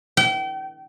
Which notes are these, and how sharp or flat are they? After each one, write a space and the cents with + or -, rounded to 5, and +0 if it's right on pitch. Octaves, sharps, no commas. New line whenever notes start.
G5 -35